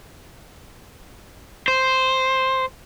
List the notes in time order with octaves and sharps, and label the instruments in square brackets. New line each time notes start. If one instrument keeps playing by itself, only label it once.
[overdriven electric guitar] C5